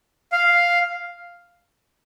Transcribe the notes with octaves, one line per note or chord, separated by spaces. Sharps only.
F5